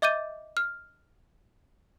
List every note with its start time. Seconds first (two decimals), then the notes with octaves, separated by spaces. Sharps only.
0.02 D#5 E5 D6 G6 A6 D#7
0.57 F6